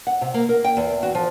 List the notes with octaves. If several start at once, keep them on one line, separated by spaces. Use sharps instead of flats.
F#5
C3
A#3
A#4
G5
E2
F#4
F3